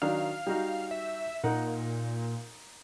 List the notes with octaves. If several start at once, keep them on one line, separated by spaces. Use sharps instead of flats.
D#3 F#3 D4 F5
G3 D#4 F#4
E5
A#2 D#4 A#4 F#5